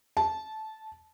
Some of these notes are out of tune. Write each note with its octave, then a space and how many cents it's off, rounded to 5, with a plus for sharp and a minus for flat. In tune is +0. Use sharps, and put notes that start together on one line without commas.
A5 -15